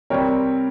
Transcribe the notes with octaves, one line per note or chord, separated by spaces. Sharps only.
C3 G3 C4 A#4 C#5